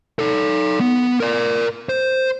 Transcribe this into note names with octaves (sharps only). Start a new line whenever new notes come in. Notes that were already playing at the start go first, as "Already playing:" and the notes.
D#4 A4
B3
A#4 D5
C5